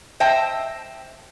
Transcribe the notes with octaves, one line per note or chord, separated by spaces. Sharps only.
C5 D#5 E5 G5 A5